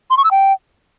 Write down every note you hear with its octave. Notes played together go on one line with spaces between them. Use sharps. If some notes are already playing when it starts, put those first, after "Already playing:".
C6
C#6
E6
G5